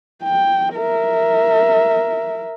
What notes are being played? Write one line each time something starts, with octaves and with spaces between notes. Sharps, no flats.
G5
A#4 E5